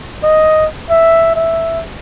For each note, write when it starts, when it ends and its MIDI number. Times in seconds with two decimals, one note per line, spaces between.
0.23 0.67 75
0.90 1.34 76
1.36 1.81 76